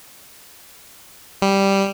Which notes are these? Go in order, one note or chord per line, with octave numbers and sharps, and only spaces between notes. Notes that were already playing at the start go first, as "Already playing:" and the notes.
G3